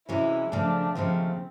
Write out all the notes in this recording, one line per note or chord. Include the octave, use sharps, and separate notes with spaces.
C3 E3 G#3 C#4 E4 F#4
D#2 C#3 F3 A3 D4
D#2 C#3 F3 A3 C4